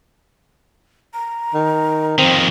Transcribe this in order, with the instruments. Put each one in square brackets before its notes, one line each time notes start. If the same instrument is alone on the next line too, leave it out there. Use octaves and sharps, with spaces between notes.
[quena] A#5
[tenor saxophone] D#3
[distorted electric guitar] F2 D#3 [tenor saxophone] C4